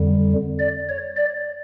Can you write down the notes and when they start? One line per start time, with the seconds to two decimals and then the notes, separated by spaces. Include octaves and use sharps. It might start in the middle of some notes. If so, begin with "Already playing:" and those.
Already playing: F2 D3 G3
0.59 D5
0.89 C#5
1.17 D5